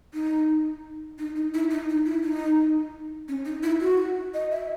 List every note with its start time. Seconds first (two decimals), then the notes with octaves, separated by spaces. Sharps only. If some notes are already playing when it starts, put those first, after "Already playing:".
0.14 D#4
1.18 D#4
1.35 D#4
1.54 E4
1.70 D#4
1.89 D#4
2.06 E4
2.24 D#4
3.28 C#4
3.45 D#4
3.63 E4
3.81 F#4
4.34 D#5
4.51 E5